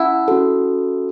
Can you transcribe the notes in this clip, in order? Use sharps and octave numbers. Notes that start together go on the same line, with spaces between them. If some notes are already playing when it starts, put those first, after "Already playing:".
Already playing: C#4 E4 F#5 A5
C#4 F#4 A4